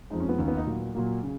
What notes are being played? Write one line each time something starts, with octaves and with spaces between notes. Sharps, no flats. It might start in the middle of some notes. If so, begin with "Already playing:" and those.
F2 F3 G#3 D#4
C#4
B3
D#2 D#3 A#3 C#4
B3
D#4
A#2 F#3 A#3
A#2 F#3 A#3
C#3